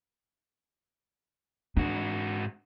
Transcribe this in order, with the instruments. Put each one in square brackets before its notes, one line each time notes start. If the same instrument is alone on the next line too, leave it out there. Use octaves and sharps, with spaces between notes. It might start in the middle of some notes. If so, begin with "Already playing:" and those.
[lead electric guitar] G#2 F#4 [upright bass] D4